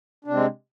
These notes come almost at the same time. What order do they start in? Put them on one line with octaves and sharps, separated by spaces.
D4 C3 C4 G#3